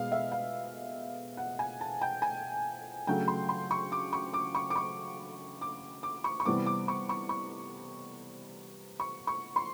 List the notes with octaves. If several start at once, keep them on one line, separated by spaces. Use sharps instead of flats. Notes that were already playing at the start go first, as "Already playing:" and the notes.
Already playing: B2 G#3 B3 F5
E5
F5
F#5
G#5
A5
G5
G#5
C#3 F#3 A3 D4 G5
C6
C6
C#6
D6
C#6
D6
C#6
D6
C#6
D6
D6
C#6
C#6
C3 E3 G3 B3 D6
D6
C#6
C#6
C#6
C#6
C#6
C6